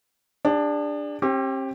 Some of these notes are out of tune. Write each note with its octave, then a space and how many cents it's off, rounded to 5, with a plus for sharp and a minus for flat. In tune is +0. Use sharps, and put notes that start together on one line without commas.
D4 +5 G#4 -45
C4 +45 G4 +0